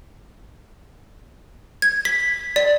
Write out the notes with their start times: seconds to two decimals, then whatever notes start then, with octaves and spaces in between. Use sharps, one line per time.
1.82 G#6
2.05 B6
2.56 D5